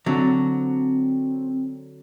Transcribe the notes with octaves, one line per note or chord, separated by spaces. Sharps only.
D3 F#3 C4